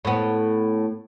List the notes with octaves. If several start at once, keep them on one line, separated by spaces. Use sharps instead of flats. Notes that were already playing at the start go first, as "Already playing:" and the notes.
A2 B3